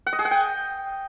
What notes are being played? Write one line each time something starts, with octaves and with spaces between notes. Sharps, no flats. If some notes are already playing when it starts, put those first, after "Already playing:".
F#5
D#5
G#4
F#5
G5